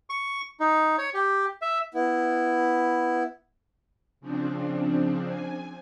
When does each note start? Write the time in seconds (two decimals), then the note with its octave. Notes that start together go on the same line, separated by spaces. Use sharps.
0.10 C#6
0.60 D#4
0.98 C#5
1.14 G4
1.62 E5
1.94 B3 E4
4.21 C#3 F3 C4 D4
5.27 G#5